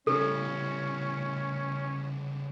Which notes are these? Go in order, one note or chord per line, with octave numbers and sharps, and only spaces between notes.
C#3 G3 C#4 A4